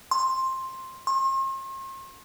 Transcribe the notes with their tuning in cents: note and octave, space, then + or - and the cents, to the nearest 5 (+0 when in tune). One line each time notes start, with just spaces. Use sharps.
C6 +10
C6 +45